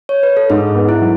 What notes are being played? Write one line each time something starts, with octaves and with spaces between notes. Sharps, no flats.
C#5
B4
A4
G#2 G#4
B3
E4
F#3